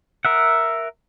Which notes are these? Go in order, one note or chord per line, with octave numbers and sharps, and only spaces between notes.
A#4 E5 F#5